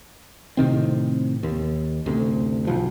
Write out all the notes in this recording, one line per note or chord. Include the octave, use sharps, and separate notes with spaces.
A2 C3 D#3 C4
D#2
F#1 D2 C3
B1 F3